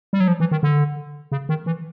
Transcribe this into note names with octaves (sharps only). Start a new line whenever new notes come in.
G3
F#3
F3
E3
D#3
D3
C#3
D#3
E3